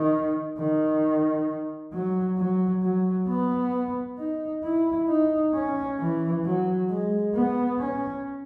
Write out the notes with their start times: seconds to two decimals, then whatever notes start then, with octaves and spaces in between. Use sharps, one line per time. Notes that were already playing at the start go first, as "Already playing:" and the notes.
Already playing: D#3
0.58 D#3
1.92 F#3
2.38 F#3
2.82 F#3
3.28 B3
4.18 D#4
4.64 E4
5.08 D#4
5.54 C#4
5.99 E3
6.44 F#3
6.89 G#3
7.34 B3
7.79 C#4